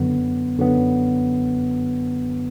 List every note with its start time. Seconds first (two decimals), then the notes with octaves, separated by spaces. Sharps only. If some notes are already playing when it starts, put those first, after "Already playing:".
Already playing: F#2 D3 F#3 B3
0.59 F#2 D3 F#3 B3